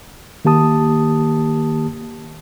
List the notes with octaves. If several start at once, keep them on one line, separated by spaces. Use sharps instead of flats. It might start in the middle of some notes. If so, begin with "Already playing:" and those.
D#3 A#3 G4 A5 D#6